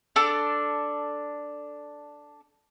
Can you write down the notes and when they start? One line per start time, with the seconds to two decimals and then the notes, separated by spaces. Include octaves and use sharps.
0.16 D4 A4 A5 D6